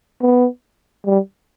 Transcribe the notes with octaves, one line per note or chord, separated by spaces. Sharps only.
B3
G3